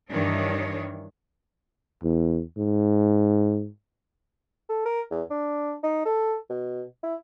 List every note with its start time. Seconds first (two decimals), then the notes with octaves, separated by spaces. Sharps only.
0.10 G2 D#3 E3 D4 C#5
2.03 E2
2.57 G#2
4.69 A4
4.85 A#4
5.11 E2
5.30 D4
5.83 D#4
6.05 A4
6.50 B2
7.03 E4